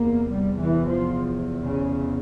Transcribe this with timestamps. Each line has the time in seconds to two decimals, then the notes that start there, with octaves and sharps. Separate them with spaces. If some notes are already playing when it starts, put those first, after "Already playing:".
Already playing: E2 C3 A#3
0.32 G3
0.60 E3
0.90 F3
1.63 C#3